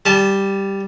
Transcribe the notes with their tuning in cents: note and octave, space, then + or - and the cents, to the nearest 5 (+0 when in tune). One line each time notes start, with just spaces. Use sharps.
G3 +0 A5 -25